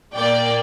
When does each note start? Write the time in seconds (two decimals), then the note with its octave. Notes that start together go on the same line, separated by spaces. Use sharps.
0.14 A#2 A#3 D5 G5